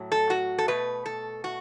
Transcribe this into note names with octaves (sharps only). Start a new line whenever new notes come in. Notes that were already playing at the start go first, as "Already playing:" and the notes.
Already playing: A2 F#3
A4
F#4
A4
B2 A3 B4
A4
F#4